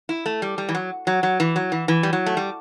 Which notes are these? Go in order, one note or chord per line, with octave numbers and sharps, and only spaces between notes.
E4
A3
G3
G3
E3
F#3
F#3
F#3
E3
F#3
E3
E3
G3
F#3
A3
G3